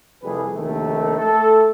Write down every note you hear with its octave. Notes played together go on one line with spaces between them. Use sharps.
C2 F2 G3 A3 G#4 B4
A#1 D#2 C3 D#3 A3
A3 A4